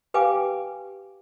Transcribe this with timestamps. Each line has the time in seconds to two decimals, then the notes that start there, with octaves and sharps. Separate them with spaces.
0.14 G4 B4 F5 G5 G#5 D6